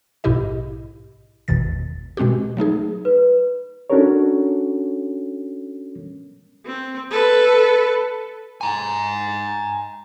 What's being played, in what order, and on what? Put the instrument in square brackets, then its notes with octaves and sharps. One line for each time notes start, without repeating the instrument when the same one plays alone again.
[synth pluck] A#1 G#2 B2 E4 G4 D#5
G#1 E2 B2 D#3 A6
B2 G#3 C4 F#4 G4
F#3 A3 D#4 G#4
[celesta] B4
[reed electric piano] C#4 D4 F#4 A4 A#4 C#5
[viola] C4
A4 B4
[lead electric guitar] G#5 A#5